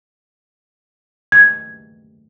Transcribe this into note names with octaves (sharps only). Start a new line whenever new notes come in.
G#6